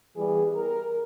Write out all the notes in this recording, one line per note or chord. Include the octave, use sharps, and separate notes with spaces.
E3 G3 B3 G#4
A#4